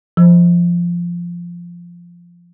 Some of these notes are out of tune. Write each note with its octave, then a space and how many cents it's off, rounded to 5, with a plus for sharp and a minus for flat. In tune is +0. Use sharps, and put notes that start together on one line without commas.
F3 -10